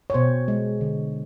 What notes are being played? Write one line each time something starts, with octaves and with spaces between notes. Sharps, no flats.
C#5
B2 C5
G#3
D3